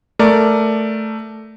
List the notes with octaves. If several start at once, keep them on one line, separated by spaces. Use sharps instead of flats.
A3 A#4 D5